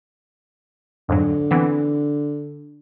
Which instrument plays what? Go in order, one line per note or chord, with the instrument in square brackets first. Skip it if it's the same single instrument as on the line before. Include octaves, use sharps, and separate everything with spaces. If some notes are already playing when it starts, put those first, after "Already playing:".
[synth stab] F2 G#2 F#3 [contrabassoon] D3
[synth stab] E3 B3 C4